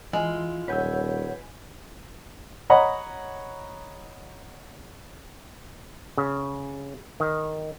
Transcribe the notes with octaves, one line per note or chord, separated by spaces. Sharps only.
E3 G#3 E4 F4
D#1 B4 C#5 F#5 G#5 E6 G6
C#5 D#5 F#5 A#5 B5
C#3
D#3